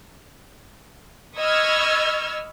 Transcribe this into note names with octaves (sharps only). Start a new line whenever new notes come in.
D#5 B5 C#6 E6 F6 G#6